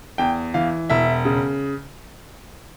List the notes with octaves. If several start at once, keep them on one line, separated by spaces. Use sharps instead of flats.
E2 G5
E3 F5
E1 E5
C#3